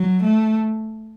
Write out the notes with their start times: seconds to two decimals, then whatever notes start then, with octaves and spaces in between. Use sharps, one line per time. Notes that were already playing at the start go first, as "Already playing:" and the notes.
Already playing: F#3
0.23 A3